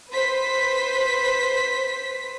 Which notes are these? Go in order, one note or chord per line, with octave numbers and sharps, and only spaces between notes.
B4 C5 B6